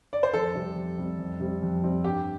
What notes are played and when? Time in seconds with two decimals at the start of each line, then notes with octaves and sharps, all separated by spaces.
0.13 D5
0.23 C5
0.34 F2 A4
0.55 C3 G3 C4
0.76 F2
0.98 C3 G3 C4
1.19 F2
1.40 C3 G3 C4
1.62 F2
1.83 C3 G3 C4
2.04 G2 G4